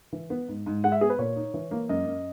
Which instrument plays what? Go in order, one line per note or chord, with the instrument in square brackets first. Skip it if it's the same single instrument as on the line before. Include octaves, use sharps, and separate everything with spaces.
[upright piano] E3
B3
G#2
G#2
[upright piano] G#3 [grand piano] F#5
[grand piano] E5
[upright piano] B3 [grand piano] G#4
[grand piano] B4
[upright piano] A#2 [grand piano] C#5
[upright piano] D#4
E3
A#3
[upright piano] F#2 [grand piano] D#5
[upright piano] F#2